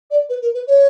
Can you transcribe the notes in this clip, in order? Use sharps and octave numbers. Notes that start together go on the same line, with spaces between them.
D5
B4
A#4
B4
C#5